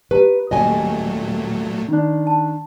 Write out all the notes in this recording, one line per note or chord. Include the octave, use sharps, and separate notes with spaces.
G4 B4 A#5
D#1 A#2 F#3 A3 D#5 G#5
D#3 D4
A5